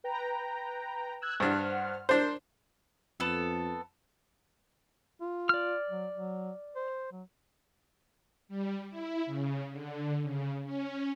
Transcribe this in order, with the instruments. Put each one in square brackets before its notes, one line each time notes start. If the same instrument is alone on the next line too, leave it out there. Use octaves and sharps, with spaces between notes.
[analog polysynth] B4 G5 A#5
E6 F#6 G#6
[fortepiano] G2 D4 [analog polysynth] C5 F#5 F6
[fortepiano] D4 C5 [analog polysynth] A#4
[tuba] F2 [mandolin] B3 A4
[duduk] F4
[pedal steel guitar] D5 F6
[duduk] F#3
F#3
C5
F#3
[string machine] G3
E4
C#3
D3
C#3
C#4